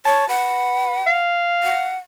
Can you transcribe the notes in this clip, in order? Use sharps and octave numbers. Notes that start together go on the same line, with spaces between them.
C#5 A5
B4 F#5
F5
F#5